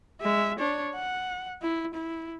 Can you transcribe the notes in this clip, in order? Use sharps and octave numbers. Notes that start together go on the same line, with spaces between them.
G#3 E5
D4 C#5
F#5
E4
E4